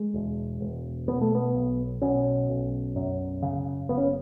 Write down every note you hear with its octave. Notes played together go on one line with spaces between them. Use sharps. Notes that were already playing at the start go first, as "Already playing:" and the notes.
Already playing: G#3
E1
E1
B2 B3
A3
B3
B1
B2 C#4
B1
F#2
C#3
F#1 B3
C#4